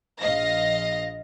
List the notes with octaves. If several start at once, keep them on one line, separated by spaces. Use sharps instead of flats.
A#1 D#5 F5 A#6